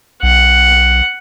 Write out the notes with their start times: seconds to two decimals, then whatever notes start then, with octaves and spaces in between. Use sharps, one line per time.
0.23 B1 F#5